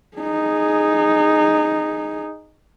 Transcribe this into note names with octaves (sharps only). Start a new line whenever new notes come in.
D#4 G#4